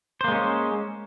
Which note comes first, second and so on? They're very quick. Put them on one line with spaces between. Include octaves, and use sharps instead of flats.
C5 A#3 G#3 C#4